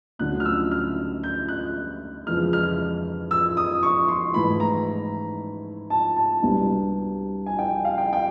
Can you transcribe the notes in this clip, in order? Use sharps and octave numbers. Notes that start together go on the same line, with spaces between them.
D2 D3 F#3 A3 C#4 F#6
F6
E6
F6
G6
F#6
F2 C#3 E3 G#3 F6
F6
E6
D#6
C#6
C6
G#2 E3 A3 B5
A#5
A5
A5
C2 B2 G3 B3 D4
G#5
G5
F5
G5
G5